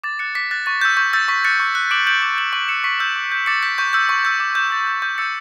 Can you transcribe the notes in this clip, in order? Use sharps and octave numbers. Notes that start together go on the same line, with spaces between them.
D6 A6
F#6 A6 C#7
D6 B6
F#6 A6
C#6 A6
E6 G6
C#6 G6
E6 G6 A6
C#6 B6
F#6 A6 C#7
C#6
F#6
D6 D7 F#7
G6 D7 F#7
D6
G6 D7 F#7
C#6 D7 F#7
E6 G6 C#7 E7
C#6 B6 D7
E6 G6
D6
G6
D6 A6 C#7
G6 B6
C#6 G6
E6 G6
C#6
E6 G6
D6
G6
D6 A6
G6
C#6 G6
E6 G6 A6 C#7